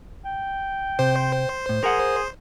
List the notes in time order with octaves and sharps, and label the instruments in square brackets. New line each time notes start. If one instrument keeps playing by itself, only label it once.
[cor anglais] G5
[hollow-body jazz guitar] C3 [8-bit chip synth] C5
[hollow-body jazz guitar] A2
[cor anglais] G#4 [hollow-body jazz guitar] A#4 F#5